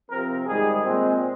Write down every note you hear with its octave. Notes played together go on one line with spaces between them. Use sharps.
C3 F3 C4 A#4
G#2 D#3 G3 G#4
A#2 G#3 C4